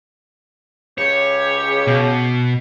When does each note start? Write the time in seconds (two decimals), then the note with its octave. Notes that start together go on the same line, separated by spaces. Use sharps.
0.98 C#2 C#3 G4 C#5
1.87 B2